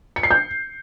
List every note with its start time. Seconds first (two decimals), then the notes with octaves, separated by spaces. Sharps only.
0.16 C#7
0.23 C7
0.31 G6